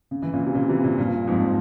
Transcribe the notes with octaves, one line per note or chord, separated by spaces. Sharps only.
C#3
E3
A#2 C#3
C3
A#2 C#3
C3 E3
A#2 C#3
G2 A#2
F2 G#2